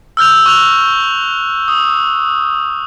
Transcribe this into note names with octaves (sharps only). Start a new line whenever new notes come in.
E6 F6 G6 F7
C#6 F#6 F7
D#6